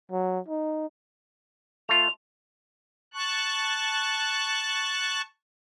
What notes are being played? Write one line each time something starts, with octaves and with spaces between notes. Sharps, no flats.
F#3
D#4
A3 F4 F7
A5 C#6 F#6